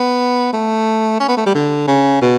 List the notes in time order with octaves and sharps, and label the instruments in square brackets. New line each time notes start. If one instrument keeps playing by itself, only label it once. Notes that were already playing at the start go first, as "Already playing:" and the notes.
Already playing: [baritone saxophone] B3
A3
C#4
B3
A3
G3
D3
C#3
B2